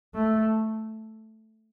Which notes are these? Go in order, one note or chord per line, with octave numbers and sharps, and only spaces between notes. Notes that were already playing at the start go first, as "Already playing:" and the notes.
A3